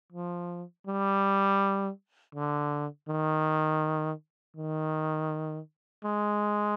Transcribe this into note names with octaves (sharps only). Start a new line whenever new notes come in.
F3
G3
D3
D#3
D#3
G#3